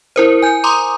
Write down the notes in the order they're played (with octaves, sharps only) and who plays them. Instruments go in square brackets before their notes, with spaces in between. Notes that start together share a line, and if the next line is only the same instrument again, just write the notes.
[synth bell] E4 A#4 C5
G#5 G6
A#5 C6 D6 D#6